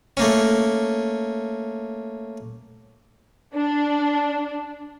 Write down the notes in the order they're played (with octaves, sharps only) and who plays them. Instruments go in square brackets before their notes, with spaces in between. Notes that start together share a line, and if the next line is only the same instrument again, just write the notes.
[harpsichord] A3 A#3 C#4
[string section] D4